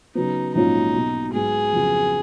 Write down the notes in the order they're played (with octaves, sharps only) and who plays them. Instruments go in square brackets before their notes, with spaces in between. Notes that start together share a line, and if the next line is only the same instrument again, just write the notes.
[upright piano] C#3 F#3 B3 [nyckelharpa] D#4
[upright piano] A#1 G#2 F#3 C#4 F4 [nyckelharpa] D#4
[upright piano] B1 B2 F#3
[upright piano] G#2 F#3 B3 [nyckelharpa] G#4
[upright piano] F2 C#3 F#3 B3